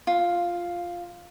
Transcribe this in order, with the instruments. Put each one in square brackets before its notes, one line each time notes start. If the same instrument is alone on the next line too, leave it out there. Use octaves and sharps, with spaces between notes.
[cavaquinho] F4